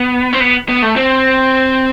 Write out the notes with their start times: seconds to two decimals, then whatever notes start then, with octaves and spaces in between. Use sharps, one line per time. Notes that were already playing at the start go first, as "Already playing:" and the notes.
Already playing: B3
0.33 C4
0.41 B3
0.69 B3
0.82 A3
0.96 C4